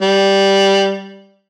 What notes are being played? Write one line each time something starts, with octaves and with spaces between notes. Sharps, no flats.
G3